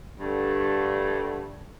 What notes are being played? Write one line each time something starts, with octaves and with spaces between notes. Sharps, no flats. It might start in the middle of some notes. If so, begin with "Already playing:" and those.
G2 D3 A3